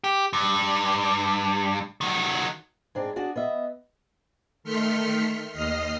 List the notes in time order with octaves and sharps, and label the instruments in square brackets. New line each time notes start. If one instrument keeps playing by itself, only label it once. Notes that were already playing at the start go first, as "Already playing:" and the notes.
[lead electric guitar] G4
G2
D#3 F#3
[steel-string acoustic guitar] G#2 C4 D4
D4 F#4 G#4 D5
B3 D#5 E5
[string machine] D#3 A3 C6 F6 B6 C#7
D#2 D#5 F6 C7